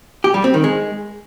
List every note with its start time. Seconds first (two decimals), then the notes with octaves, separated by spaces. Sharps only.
0.24 G4
0.34 G3
0.44 C4
0.54 D#3
0.64 G#3